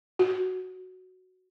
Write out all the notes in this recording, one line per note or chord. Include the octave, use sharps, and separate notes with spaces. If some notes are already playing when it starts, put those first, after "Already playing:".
F#4